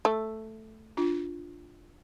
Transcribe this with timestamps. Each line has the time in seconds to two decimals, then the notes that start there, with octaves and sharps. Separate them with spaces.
0.05 A3
0.97 D4 F4